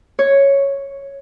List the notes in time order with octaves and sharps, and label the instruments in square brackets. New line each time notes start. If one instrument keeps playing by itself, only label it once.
[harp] C#5